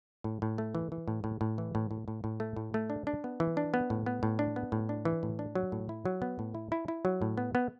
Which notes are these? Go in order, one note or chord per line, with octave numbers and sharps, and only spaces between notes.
A2
A2
A3
E3
E3
A2
A2
A2
E3
A2
A2
A2
A2
A3
A2
A3
D4
D4
B3
E3
D4
B3
A2
B3
A2
D4
B3
A2
D4
E3
A2
D4
F#3
A2
E4
F#3
B3
A2
E4
E4
E4
F#3
A2
B3
B3